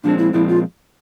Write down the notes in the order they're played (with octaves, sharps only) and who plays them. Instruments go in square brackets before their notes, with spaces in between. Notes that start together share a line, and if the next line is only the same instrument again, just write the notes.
[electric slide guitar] A#2 F3 G#3 C4 [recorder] D4
[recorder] E4
[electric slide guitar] A#2 F3 G#3 C4 [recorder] E4
[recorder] F4